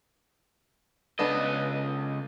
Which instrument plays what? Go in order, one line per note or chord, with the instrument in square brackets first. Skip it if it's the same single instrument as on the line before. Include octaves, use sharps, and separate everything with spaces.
[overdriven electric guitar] C#2 D#5 [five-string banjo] B3 D4 A4